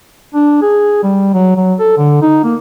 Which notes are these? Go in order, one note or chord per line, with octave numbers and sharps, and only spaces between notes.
D4
G#4
G3
F#3
F#3
A4
D3
D#4
A#3